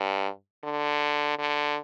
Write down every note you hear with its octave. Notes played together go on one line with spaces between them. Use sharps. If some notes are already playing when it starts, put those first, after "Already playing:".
Already playing: G2
D3
D3